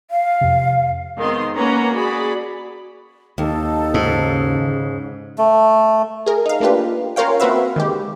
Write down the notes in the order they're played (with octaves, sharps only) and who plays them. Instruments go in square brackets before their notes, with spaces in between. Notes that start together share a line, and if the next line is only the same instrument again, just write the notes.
[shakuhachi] F5
[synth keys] F2 C3
[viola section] D#3 G#3 B3 C4 C6
A#3 C#4 B4 F#5 A#5
F#4 G#4 D5 B5
[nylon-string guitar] D#2 [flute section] D#4 A4
[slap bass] G#2 [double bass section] C#3
[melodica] A3
[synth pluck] G#4 A#4
D#4 F5
A3 A#3 D4 F4 G4 B4
C#4 F4 A#4 C#5 F5 G5
A#3 C4 F#4 B4 E5 F5
D#3 G#3 G4